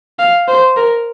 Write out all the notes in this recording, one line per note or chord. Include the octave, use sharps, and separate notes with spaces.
F5
C5
A#4